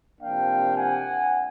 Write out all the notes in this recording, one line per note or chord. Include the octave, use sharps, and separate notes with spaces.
C3 F3 A#3 D4 F5 G5
F#5 G#5